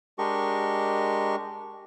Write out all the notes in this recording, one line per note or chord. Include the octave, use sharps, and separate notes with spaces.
G#3 D4 G4 A#4 D#5 C#6